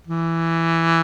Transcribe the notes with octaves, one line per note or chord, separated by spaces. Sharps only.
E3